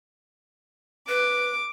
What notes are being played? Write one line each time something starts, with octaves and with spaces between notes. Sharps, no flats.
B4 D6